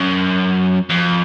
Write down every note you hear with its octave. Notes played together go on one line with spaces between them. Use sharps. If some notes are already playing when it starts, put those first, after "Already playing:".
Already playing: F#2
F2